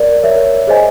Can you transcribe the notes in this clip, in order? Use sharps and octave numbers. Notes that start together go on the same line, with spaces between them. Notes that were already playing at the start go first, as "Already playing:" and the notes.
Already playing: A#4 D5
A#4 C#5 E5
G#4 C5 D#5 G#5